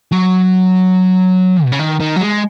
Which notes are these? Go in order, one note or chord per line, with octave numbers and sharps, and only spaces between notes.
F#3
B2
C#3
D#3
D#3
F#3
G#3